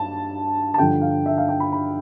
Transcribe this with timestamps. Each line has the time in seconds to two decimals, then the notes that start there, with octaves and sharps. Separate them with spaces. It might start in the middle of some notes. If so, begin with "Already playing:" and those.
Already playing: G2 A5
0.74 A5
0.78 G2 D3 F3 G5
1.02 F5
1.26 E5
1.38 F5
1.49 G5
1.60 B5
1.73 B5